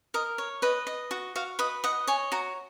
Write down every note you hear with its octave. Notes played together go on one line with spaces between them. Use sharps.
A#4 D#5
C#5
B4 D#5
D#5
F#4
F#4 F5
B4 D#5
D#5 F#5
C#5 G#5
F#4 A#5